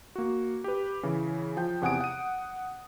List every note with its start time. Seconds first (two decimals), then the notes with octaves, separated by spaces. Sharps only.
0.16 A#3 F#4
0.64 G4 B4
1.03 C#3 E3
1.57 F3 G5 G6
1.82 E2 C3 F#5 G#5 D#6 D7
2.01 F#5 D#7